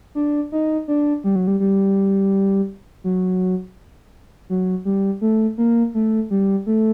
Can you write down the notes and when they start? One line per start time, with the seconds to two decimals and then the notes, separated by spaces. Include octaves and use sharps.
0.15 D4
0.52 D#4
0.88 D4
1.24 G3
1.36 F#3
1.47 G3
1.60 G3
3.04 F#3
4.50 F#3
4.85 G3
5.21 A3
5.58 A#3
5.94 A3
6.30 G3
6.66 A3